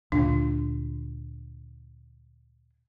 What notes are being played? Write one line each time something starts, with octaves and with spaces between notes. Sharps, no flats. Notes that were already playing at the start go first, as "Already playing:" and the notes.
D2 A#2 D3 D4